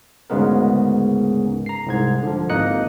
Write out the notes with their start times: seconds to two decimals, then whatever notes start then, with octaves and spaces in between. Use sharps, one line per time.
0.30 D2 G#2 C#3 G#3 B3 A#4
1.66 A#5 C7
1.86 C2 G#2 G#6
2.23 D3 F3
2.50 G#1 A#3 D#4 D#5 F#6 C#7